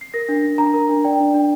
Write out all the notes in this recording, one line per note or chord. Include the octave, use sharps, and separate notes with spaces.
C7
A#4 A#6
D4
D4
D4 A#5
A#4
D4
D5 G5
D4
D4